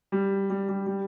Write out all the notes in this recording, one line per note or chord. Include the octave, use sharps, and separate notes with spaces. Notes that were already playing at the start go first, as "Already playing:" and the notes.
G3
G3
G3
G3